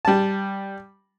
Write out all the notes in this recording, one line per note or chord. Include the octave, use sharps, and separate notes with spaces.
G3 A5